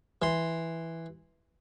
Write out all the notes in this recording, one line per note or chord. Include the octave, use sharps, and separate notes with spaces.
E3 C6